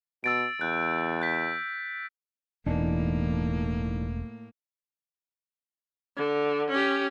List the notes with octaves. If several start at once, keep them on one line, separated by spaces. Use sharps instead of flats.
B2 E6 A6 D7
E2 F#6 G6
F#6 G6 B6
E1 E2 A2 E3 A#3 D4 D#4
D3
C#4 G4